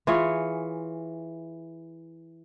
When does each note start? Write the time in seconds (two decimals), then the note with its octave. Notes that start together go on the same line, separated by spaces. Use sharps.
0.07 E3 F4 G#4 C#5